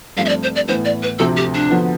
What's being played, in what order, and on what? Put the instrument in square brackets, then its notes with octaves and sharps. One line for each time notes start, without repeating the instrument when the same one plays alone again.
[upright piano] G2 F3 A3 C4 [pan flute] F5
[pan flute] E5
D5
C5
D5
[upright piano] A2 E3 B3 [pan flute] C5
[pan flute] D5
B4
[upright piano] D2 C3 F3 A3 C4 [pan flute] A4
[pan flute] G4
D4
[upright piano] D3 F3 B3